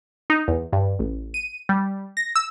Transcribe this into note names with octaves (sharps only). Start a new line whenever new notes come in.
D#4
E2
G2
A1
D#7
G3
A#6
E6